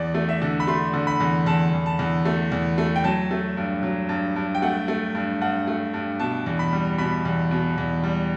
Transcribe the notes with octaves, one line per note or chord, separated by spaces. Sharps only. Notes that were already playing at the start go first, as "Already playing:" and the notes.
Already playing: E2 D5
A3
E5
D3
B5
A3 C6
D3
B5
E2
E2 A5
E2
A5
E2
A3
E2
A3
G5
F#3 A5
A3
G2
F#3
G2
G2
G5
A3 F#5
A3
G2
G2 F#5
A3
G2
B2 A5
E2
B5
G3
B2 B5
E2
B2
E2
G3